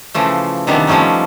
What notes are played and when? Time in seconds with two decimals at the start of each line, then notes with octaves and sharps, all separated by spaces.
0.14 C#3 E3 F3 A3
0.67 C3 D#3 E3 G3 B3 D4
0.87 F3 G3 A3 C#4 D#4